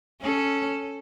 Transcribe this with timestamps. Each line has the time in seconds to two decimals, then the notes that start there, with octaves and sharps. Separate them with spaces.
0.22 C#4 A4